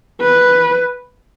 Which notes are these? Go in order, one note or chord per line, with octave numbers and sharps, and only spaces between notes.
B4